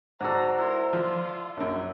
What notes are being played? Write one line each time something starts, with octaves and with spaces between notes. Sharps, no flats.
G#2 F#4 A4 C5 D5 F#5 A#5
E4 A#4 C6
F3 F4
A#1 F#2 F#3